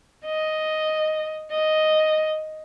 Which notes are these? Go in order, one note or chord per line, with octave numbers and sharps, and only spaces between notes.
D#5
D#5